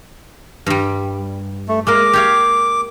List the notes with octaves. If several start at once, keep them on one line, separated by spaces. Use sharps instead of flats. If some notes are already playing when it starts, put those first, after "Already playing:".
G2 G3
A3
G#3 A#3 A#4 D6
G4 C#5 F5